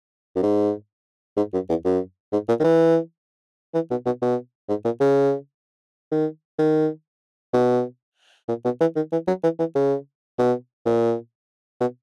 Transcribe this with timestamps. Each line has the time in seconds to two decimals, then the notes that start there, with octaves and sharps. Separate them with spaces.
0.36 F#2
0.43 G#2
1.37 G#2
1.54 F#2
1.69 E2
1.85 F#2
2.33 G#2
2.49 A#2
2.60 D#3
2.64 E3
3.74 E3
3.91 B2
4.06 B2
4.22 B2
4.69 G#2
4.85 A#2
5.00 C#3
6.12 D#3
6.59 D#3
7.54 B2
8.49 A#2
8.65 B2
8.81 E3
8.96 D#3
9.12 E3
9.28 F#3
9.44 E3
9.59 E3
9.75 C#3
10.39 B2
10.86 A#2
11.81 B2